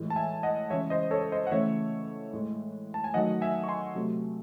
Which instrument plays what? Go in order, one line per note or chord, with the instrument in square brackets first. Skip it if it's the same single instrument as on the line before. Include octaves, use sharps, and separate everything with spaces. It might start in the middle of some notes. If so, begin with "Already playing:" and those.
Already playing: [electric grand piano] A2 E3 G#3
A5
E5 G#5
D#5 F#5
C#3 E3 G#3 C#5 E5
C5 D#5
A4 C#5
C5 D#5
F#5
C#3 E3 A3 C#5 E5
A2 G#3
A5
G#5
D#3 F#3 A3 D#5 F#5
E5 G#5
C#6
G#5 C6
C3 F#3 A3